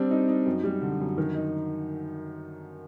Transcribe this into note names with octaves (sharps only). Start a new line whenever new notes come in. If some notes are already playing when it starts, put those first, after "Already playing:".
Already playing: G3 C4 D4
D#4
D#4
F#2
G3
D3
F#2
D#3
D#4